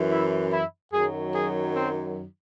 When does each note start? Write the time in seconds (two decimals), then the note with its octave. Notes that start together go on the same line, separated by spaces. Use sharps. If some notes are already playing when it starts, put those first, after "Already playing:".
Already playing: F#2 E3
0.11 E4
0.52 E4
0.93 F#2 D#3 F#3 G#4
1.34 G#4
1.76 C4